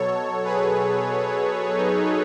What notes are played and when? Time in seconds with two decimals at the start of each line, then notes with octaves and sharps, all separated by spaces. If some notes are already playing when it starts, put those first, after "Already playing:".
Already playing: B2 F#3 A4 C#5
0.44 G#4 B4
1.76 D#4